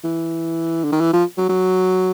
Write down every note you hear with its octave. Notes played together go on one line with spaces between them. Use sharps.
E3
D3
D#3
E3
F3
F#3
F#3